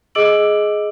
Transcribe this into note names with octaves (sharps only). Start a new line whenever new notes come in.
G#4 D#5 D6 E6 D7 F#7